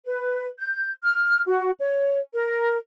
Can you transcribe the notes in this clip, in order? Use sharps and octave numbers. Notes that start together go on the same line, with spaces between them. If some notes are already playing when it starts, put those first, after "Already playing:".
B4
G6
F6
F#4
C#5
A#4